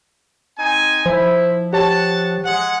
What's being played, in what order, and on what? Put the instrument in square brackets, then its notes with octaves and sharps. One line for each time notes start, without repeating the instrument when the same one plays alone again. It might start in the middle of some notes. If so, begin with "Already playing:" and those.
[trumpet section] C4 D#4 G#5
[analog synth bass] F3 [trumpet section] E4 [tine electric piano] C5
[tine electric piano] G4 C#5 [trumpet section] F#5 A5
[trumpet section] G#3 F#5